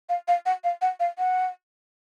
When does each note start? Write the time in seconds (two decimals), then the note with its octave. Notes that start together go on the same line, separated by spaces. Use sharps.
0.09 F5
0.28 F5
0.46 F#5
0.64 F5
0.82 F#5
1.00 F5
1.18 F#5